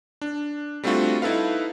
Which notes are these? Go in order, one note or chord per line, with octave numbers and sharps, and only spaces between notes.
D4
G3 A3 C4 D4 F4 F#4
D#4 E4 A4 B4 F5